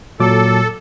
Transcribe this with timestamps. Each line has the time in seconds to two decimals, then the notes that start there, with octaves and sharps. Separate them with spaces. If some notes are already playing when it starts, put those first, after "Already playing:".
0.20 A#2 F#3 A4 D6